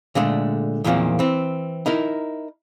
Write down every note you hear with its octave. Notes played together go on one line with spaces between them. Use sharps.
A#2 D3 G#3 A3
E2 A#2 D#3 F3 A#3 C4
E3 C4
D#4 E4 A#4